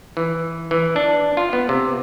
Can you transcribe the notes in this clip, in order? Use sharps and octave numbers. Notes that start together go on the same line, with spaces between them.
E3
E3
D4
F4
B3
C3